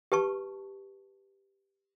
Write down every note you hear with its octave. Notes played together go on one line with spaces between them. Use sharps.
G4 B4 A5 C#6